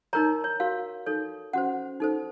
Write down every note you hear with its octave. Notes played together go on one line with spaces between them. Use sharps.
D#4 A#4 C#5 A#5
C#5
F#4 A#4 C#5 F5
D#4 A4 C#5
C#4 F#4 C5 F#5
D#4 A4 C5